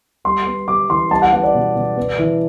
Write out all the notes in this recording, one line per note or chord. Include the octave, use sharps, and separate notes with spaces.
G3 C6
B3
G3 D6
E3 C6
G3 A5
F#5
B3 F#5
D5
B2
B2
B3
E3